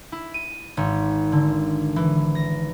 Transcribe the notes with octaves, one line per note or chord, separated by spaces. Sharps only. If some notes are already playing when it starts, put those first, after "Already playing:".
E4
D#7
G#1
D3
E3
A#6